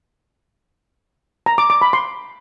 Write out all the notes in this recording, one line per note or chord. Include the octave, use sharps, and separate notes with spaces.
A#5
D6
D6
B5
C6